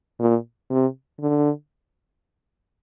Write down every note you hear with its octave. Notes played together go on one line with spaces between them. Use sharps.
A#2
C3
D3